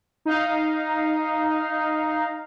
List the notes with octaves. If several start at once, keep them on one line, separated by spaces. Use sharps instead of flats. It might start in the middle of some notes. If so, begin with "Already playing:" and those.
D#4 F5